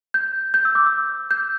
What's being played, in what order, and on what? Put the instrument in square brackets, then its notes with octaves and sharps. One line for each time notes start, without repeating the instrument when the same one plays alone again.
[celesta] G6
G6
E6
D6
E6
G6